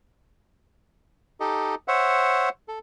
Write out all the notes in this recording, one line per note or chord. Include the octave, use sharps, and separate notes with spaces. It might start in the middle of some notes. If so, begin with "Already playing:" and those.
D#4 G4 A4 D#5
C5 C#5 E5 F#5
A4